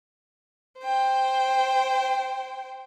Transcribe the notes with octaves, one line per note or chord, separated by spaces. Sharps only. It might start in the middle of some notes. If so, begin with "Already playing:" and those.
C5 G5